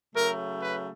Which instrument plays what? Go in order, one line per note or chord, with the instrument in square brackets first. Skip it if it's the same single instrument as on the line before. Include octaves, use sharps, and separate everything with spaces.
[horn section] C#3 F#3 A3 A#4
B4